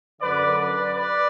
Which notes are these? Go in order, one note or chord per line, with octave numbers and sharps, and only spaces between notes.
F#2 D3 B4 D5
B4 D5
B4 D5